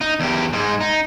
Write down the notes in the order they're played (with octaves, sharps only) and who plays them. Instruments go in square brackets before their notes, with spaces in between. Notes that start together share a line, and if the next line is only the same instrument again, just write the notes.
[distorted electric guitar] D#4
E2 G4
G#2 G#3
D#4